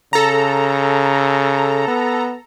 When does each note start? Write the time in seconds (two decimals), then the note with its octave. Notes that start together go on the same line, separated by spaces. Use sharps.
0.13 C#3 A4 A#5
1.88 B3